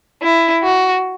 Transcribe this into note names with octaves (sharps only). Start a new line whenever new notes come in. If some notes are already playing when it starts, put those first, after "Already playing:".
E4
F#4